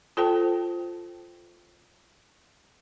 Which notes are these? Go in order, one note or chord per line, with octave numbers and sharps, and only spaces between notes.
F4 A4 C5 G5 A5